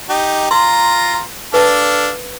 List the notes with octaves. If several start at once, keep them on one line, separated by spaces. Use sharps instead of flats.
D#4 G4
F4 A#5 C6
D4 A4 B4 F5 A5